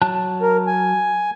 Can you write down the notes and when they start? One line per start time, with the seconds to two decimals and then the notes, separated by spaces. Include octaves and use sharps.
0.02 F#3 A5 F#6
0.42 A#4
0.67 G#5